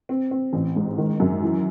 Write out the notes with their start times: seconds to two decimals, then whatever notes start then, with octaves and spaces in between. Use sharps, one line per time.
0.09 C4
0.31 C4
0.53 A1
0.76 G#2
0.98 D#3
1.20 F#2
1.42 E3